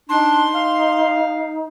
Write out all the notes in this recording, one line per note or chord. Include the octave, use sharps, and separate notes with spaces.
D4 D#4 C6
F5